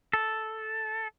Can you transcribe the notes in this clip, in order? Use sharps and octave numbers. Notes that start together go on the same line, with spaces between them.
A4